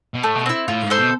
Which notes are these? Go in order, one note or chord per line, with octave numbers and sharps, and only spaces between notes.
B2
A2 A3
B2
C4 E4
A2 F4
G#2
A4 C5
B2